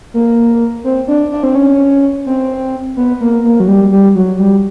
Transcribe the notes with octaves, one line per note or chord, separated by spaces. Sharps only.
A#3
C4
D4
D4
C4
C#4
C4
B3
A#3
A#3
F#3
G3
G3
F#3
G3